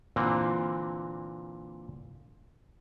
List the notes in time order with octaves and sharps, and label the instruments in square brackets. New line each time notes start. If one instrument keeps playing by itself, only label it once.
[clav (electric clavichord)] A#2 D3 E3 A#3 C4